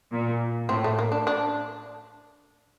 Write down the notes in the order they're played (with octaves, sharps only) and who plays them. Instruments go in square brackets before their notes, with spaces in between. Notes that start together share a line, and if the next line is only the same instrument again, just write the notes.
[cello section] A#2
[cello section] A2 [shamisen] C4
[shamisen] A3
A#3
D4
D4